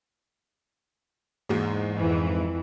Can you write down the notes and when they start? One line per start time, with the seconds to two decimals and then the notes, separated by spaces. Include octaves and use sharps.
1.49 E2 G#2 G#3 A#3
1.95 F2 E3